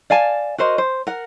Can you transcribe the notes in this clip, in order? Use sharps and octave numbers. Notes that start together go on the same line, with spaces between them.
D5 F5 G#5 A5
F#4 A#4 C5 D#5
C5
A#4 F#5